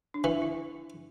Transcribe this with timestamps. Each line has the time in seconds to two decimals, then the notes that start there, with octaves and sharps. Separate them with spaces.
0.14 D4
0.24 E3 E4
0.42 E4